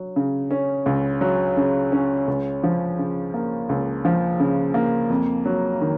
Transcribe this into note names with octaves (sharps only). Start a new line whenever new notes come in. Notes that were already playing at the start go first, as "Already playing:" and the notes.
Already playing: F#3
C#3
C#4
C#2
F#3
C#3
C#4
C#2
F3
C#3
A#3
C#2
F3
C#3
A#3
F2
F#3
D#3